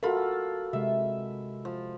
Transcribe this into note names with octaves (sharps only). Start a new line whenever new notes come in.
F4 F#4 A4 A#4 B5
C3 G#3 E5
F3